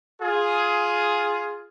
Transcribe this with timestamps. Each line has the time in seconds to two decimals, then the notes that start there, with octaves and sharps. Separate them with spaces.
0.22 F4 G#4